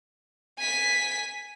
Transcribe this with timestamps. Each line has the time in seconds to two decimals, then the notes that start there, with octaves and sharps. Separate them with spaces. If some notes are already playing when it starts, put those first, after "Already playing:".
0.59 G#5 B6